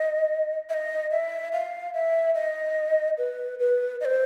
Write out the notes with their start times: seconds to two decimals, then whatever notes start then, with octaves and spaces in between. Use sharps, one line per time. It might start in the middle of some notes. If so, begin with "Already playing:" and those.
Already playing: D#5
0.69 E5
0.74 D#5
1.11 E5
1.53 F5
1.94 E5
2.35 D#5
3.18 B4
3.59 B4
4.01 D#5
4.05 C5